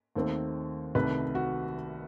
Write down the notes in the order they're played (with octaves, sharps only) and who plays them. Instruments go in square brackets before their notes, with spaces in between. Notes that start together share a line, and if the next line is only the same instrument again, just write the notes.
[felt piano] D#2 D#3 A3 C4
C2 C3 D#3 A3 B4
F#4